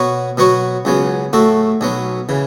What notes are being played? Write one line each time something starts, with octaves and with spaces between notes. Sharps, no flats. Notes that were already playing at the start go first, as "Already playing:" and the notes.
Already playing: B2 B3 F#4 C#5
B2 F#3 B3 F#4 C#5
C#2 C#3 F#3 B3
A2 A3 F#4 A4
B1 B2 F#3 B3
C#3 E3